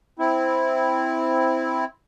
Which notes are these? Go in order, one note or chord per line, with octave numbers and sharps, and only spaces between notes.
C4 E4